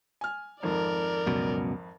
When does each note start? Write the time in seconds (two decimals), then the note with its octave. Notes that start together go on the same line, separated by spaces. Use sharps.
0.21 G#5 F6
0.63 G#1 F2 A#4 D5
1.26 C#2 F#2 B2